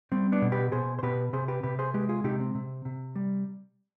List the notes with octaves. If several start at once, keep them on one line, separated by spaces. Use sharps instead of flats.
G3 C4
B3 D4
B2
G4 B4
B2 G#4 C5
C5
B2 G4 B4
C3 G#4 C5
G4 B4
C3 G4 B4
G#4 C5
G#3 G4 B4
F4 G#4
C3 D#4 G4
C4
C3
C3
G3